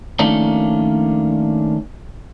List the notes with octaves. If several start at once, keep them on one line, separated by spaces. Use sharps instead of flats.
D#3 F3 A3 A#3 C#4 D4